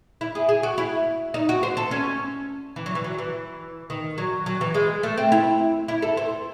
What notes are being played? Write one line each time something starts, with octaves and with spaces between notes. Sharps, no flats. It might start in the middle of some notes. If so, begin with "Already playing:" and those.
E4
G#4
G#4
F#4
E4
D#4
F#4
C5
A4
C#4
E3
F#3
E3
F#3
E3
D#3
F#3
F#3
E3
G#3
A3
C4
E4
E4
A4
C5